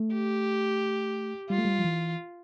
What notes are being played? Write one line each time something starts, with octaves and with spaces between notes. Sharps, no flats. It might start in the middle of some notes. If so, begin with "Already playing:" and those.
Already playing: A3
G4
G3 F4
A3
G3
F3
E3